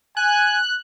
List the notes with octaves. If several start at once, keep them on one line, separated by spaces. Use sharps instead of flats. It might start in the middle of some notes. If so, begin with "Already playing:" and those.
G#5 F#6